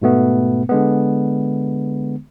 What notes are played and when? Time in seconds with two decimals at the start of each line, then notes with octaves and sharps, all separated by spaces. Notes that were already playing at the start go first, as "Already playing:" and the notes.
0.02 G#2 B2 A3 B3
0.69 D3 G#3 B3